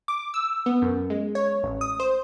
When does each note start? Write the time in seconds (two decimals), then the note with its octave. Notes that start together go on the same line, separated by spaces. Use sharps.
0.08 D6
0.34 E6
0.66 B3
0.82 F#2
1.10 G#3
1.35 C#5
1.63 A1
1.81 D#6
2.00 C5